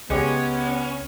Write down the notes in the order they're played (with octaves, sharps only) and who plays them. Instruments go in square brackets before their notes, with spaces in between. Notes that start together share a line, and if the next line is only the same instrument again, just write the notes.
[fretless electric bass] C#2 [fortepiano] G#3 G4 C#5 [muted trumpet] B3 [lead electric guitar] C#4